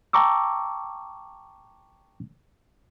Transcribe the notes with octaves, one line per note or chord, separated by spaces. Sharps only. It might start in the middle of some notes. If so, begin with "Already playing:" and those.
G5 A5 A#5 C#6 D6 E6